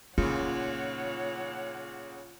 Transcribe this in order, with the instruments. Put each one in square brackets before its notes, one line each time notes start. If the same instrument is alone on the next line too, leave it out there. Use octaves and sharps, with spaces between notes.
[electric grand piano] A#2 C#3 [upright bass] D#4 [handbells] F4 C#7 [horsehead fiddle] C#5 F#5